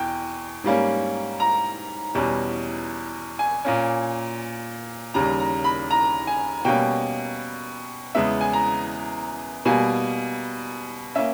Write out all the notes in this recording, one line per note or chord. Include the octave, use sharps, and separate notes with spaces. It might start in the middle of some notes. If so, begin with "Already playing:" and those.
Already playing: E2 B2 G5
G#2 G3 A#3 C#4
A#5
E2 B2 G3 C#4
G#5
A#2 A#3 C#4
D#2 C#3 G3 A#5
A#5
B5
A#5
G#5
B2 G3 A#3 C#4 G5
E2 C#3 G#3 B3 E5
G#5
A#5
B2 G3 A#3 G#5
A#3 C#4 E5